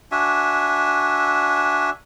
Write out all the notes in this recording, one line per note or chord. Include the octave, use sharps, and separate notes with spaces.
D4 F#4 E5 G#5